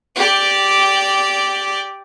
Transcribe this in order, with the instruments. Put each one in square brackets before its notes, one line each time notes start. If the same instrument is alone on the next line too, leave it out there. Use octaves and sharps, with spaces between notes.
[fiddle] G4 D5